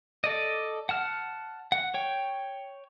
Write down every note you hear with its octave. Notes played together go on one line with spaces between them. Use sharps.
A4 D5 D#5
F#5 A5 F6
F#5
C#5 G5